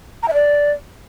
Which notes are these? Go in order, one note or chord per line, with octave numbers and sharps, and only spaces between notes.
A#5
E5
D5